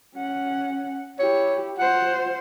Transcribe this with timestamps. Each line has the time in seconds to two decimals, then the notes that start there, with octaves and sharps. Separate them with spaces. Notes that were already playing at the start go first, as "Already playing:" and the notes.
0.15 C#4 F#5
1.19 E4 G4 C#5
1.78 F4 C5 F#5